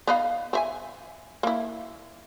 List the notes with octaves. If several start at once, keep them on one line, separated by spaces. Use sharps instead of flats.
B3 D#4 F5
C4 E5 G#5
A#3 E4